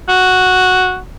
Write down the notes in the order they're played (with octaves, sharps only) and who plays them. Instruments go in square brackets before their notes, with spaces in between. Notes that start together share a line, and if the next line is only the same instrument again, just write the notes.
[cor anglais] F#4